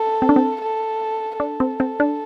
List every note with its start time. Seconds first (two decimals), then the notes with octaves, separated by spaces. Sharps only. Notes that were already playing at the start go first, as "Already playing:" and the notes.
Already playing: A4
0.22 C4
0.29 D4
0.36 C4
0.61 A4
1.40 D4 A4
1.60 C4
1.80 C4
2.00 D4